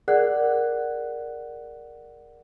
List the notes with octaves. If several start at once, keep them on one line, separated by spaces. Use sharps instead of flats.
G#4 A#4 D5 F#5 F#6